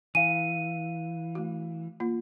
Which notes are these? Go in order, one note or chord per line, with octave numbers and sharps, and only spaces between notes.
E3 F5 G#5 D#7
A3 F#4
A#3 F4